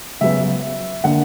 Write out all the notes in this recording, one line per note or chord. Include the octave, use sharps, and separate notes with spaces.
C#3 F#3 B3 E5
D3 A#3 F#5